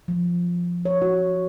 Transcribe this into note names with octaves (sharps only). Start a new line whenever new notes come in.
F3
C#5
F#4